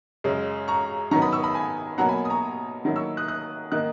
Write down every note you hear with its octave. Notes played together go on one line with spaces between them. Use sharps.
F#2 C#3 G#3
A#5 C#6
D#3 F#3 B3 A#5 C#6
B5 D#6
C#6 E6
B5 D#6
G#5 B5
B2 F#3 A#3 F#5 A#5
G#5 B5
D#6
A#5 C#6
D#3 F#3 A#3 E4
C#6 E6
D#6 F#6
D#6 F#6
D#3 A#3 D#4 D#6 F#6